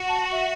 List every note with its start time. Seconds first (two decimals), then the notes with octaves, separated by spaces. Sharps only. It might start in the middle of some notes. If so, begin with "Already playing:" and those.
Already playing: F#4
0.09 A5
0.32 E5